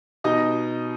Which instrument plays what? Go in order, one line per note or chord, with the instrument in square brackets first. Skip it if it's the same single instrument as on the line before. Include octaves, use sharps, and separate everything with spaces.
[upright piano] B2 D#4 D#5